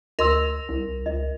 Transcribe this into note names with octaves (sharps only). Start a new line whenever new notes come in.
D2 A#4 D#5 C6 E6
C2
C#2 D#5